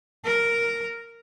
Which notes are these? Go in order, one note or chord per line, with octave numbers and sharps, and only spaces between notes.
A#4